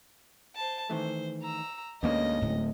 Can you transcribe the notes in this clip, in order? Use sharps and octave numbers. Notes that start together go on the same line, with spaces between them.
C5 A5
D#3 E3 A3 C5
A#5 E6
D2 G#2 A#3 B3 C#4 D#5 A#6
D1 A2